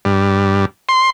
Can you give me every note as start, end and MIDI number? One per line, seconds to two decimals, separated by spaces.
0.05 0.65 43
0.89 1.10 84